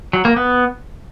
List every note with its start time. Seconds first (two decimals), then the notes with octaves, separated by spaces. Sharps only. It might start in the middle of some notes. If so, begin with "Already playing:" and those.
0.13 F#3
0.25 A#3
0.36 B3